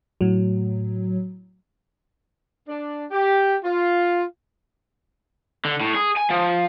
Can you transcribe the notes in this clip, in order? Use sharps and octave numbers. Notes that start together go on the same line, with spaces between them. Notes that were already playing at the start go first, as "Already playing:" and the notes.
A2 F#3
D4
G4
F4
D3
A2
G#4
G#5
F3